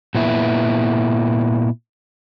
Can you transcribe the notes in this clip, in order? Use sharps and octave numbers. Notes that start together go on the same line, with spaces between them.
A#2 B3 E4